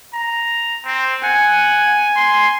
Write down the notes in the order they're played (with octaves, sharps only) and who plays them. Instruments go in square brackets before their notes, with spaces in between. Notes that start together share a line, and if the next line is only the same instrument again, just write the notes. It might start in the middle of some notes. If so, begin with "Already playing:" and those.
[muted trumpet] A#5
C4
[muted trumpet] F#5 [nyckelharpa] G#5
[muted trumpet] C6